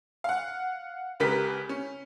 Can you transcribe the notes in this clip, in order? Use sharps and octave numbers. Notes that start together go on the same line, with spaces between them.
F5 F#5
C#2 C#3 G4 A#4 B4 B6
C#4